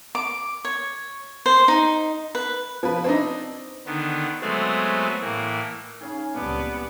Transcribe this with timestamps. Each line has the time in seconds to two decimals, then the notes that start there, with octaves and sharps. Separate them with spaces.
0.15 D6
0.65 C#5
1.46 C5
1.68 D#4
2.35 B4
2.83 F3 B4
3.04 C4 D4 D#4
3.85 D3 D#3 B3
4.41 F#3 G#3 A3 B3 C4 G#4
5.20 A2 E3 A#3
6.01 C#3 C#4 D#4 G#4
6.35 C#2 A#2 G3 B3 C4 D4 G4 D6